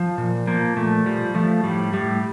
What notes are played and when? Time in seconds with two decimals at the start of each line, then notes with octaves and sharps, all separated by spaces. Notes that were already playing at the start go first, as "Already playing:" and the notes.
Already playing: F3
0.18 A#2
0.47 F3 A#3
0.76 A#2 A3
1.06 F3 G3
1.35 F3 A3
1.64 A2 G3
1.93 A2 G3